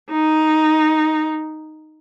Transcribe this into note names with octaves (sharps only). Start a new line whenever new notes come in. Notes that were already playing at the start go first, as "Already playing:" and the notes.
D#4